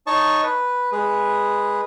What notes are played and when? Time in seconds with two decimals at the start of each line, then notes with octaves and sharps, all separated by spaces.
0.07 D#4 C#5 D#5 A5 C#6
0.43 B4
0.92 G#3 G#4 B4